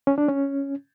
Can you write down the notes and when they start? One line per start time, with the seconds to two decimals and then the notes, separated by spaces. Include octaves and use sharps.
0.07 C#4
0.18 D4
0.28 C#4